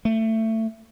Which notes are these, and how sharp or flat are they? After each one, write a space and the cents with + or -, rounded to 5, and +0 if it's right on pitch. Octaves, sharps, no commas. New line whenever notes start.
A3 +20